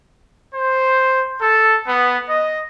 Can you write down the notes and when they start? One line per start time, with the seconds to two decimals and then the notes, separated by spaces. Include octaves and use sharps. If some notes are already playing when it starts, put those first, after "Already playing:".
0.54 C5
1.40 A4
1.87 B3
2.29 D#5